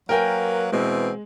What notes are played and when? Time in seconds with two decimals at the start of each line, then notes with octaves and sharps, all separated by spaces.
0.09 F#3 A#3 A#4 B4 G5 G#5
0.72 B2 E3 G#3 C4